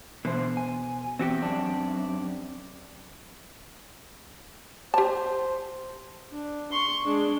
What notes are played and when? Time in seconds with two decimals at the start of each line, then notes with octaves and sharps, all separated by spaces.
0.25 B2 D3 E3 C5
0.57 G#5
1.19 E2 C4 F#4 G4
1.42 F#2 D4
4.94 G4 C5 A5
6.31 D4
6.72 C6 C#6
7.05 G#3 D4